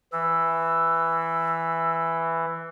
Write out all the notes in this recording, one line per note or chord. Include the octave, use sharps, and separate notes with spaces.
E3 E6